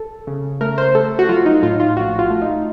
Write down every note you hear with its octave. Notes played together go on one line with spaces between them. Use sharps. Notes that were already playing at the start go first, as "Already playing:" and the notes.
Already playing: A4
C#3
A3 A#4
C5
A3 A4
F#4
F#3 F4
D#4
A2 F4
F4
A#1 F#4
F4
A3
D#4